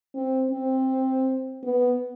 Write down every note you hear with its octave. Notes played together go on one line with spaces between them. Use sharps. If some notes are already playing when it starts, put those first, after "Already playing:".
C4
C4
B3